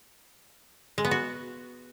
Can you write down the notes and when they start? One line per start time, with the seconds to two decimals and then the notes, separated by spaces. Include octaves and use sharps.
0.98 G#3
1.05 B3
1.11 F#4